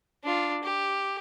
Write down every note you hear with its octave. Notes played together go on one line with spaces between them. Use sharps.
D4 F4
G4